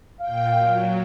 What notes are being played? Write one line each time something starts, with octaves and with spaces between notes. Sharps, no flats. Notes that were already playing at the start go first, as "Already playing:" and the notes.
A#2 F5 G5
F#3